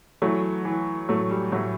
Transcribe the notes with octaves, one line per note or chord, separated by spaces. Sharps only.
E3 F#3 A3
E3
A2 F#3 A3
G3
A2 F#3